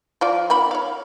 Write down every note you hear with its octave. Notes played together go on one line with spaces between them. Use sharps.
F3 F4 D5
D#3 B3 B5
C#5 F5